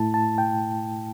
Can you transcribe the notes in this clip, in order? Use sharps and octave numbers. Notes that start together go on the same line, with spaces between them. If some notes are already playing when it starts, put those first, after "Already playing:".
Already playing: A2 A3 E4 A5
A5
G5